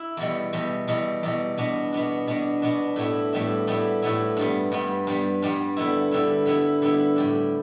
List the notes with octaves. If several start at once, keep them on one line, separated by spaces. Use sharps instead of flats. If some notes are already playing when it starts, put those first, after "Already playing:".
Already playing: E4
E2 B2 G3
E2 B2 G3
E2 B2 G3
E2 B2 G3
B2 B3 D4
B2 B3 D4
B2 B3 D4
B2 B3 D4
A2 G3 B3 E4
A2 G3 B3 E4
A2 G3 B3 E4
A2 G3 B3 E4
G2 G3 B3
G2 G3 B3
G2 G3 B3
G2 G3 B3
D3 G3 B3 E4
D3 G3 B3 E4
D3 G3 B3 E4
D3 G3 B3 E4
A2 G3 D4